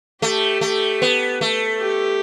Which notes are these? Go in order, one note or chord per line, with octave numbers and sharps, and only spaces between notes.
A3 G4
A3
B3
A3
G4